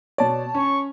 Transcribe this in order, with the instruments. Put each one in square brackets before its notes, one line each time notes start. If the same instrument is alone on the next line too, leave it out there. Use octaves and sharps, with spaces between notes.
[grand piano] B2 D5 [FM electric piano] C#5 A5
[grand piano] C#4 [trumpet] C#6